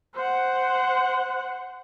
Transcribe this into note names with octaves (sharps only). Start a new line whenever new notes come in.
C5 F#5